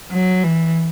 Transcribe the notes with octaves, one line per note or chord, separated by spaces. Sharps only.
F#3
E3